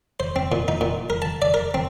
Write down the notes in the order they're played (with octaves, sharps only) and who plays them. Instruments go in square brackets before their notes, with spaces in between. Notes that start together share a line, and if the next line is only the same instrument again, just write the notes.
[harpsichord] C5
C4
A#2
D#4
A#2
A#4
A5
D5
A#4
C4